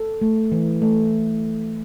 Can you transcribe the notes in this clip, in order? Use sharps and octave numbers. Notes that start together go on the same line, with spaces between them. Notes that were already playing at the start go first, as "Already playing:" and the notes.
Already playing: A4
A3
E3
A3